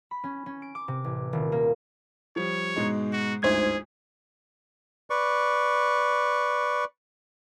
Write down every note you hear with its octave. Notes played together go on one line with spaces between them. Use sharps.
B5
C#4
C#4
D7
D6
C3
A1
D#1
A#3
F3 G3 C#5
G#2 B2 G#3
F#4
G1 D2 G#2 D#4 G#4 C5 G#6
B4 D5 C#6